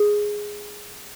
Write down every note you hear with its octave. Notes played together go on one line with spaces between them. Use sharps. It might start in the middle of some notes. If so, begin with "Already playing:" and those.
Already playing: G#4